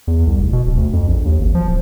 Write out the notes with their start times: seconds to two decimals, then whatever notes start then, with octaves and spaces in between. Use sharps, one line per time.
0.07 E2
0.27 C2
0.39 F1
0.53 B2
0.66 D1
0.77 D2
0.93 F2
1.08 A#1
1.25 D#2
1.39 G#1
1.55 F3
1.68 D1